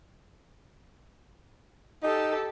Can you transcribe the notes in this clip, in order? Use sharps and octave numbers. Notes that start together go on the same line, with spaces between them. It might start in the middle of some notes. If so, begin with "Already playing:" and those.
D#4 G4 A4